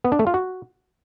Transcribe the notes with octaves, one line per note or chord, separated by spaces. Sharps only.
B3
D4
A3
F4
F#4